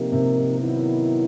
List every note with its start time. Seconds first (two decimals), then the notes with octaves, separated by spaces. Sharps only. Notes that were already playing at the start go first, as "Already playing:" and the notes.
Already playing: C3 F3 A#3 D#4 G4 A#4
0.12 C3
0.61 D#3 F#3 B3 E4